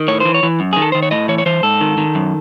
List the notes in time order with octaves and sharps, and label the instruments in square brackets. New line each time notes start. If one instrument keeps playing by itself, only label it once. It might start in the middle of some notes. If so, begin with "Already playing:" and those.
Already playing: [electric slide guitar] D#3
A2 C#5
E3 C5
C#5
E3
F#2
D#3 G#4
A4
D#3 C5
C#5
A2 D#5
E3 C#5
C#5
E3 C5
G#2 A4
D#3
D#3
F#2